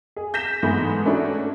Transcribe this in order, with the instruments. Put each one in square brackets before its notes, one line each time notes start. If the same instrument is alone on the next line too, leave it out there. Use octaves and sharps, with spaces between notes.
[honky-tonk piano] G#4
G6 A#6 B6 E7
G#2 E3 A3 B3
A3 C#4 D4 E4 F#4